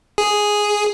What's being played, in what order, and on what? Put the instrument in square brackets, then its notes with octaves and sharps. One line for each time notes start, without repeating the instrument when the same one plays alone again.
[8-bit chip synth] G#4